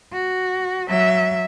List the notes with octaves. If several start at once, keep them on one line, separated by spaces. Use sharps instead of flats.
F#4
F#3 E5